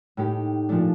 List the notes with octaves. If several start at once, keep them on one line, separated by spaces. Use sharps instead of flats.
A2 A3 D#4 G4
A#2 F3 A3 D4